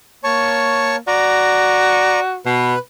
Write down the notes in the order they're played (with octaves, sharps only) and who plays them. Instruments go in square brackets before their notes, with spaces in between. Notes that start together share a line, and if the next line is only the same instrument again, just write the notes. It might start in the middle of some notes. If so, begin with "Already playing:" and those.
[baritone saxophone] A#3 [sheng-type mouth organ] C#5 A5 C#6
[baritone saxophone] F#4 [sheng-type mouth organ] D5 A#5
[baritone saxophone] B2 [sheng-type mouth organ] B4